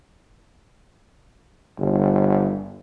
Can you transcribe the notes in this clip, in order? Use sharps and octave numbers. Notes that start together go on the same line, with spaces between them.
G1